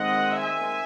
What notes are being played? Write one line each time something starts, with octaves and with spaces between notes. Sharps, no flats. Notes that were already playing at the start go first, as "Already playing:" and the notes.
Already playing: D#3 G#3 C4 D#5 F#5
E5 G#5